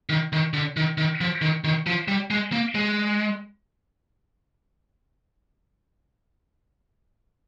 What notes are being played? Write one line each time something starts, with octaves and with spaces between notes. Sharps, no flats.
D#3
D#3
D3
D#3
D#3
F3
D#3
D#3
F3
G3
G#3
A#3
G#3